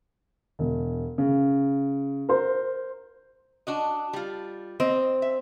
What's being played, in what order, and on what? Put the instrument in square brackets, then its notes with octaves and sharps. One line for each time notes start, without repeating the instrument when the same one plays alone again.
[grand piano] E1
C#3
A#4 C5
[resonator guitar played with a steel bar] D4 F#4 D#5
G3 F4
[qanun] C4 [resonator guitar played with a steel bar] D#5
[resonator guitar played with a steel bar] E5